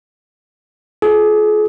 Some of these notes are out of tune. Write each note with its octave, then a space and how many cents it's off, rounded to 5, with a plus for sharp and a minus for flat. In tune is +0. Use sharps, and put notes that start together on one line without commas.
F4 +0 G#4 +40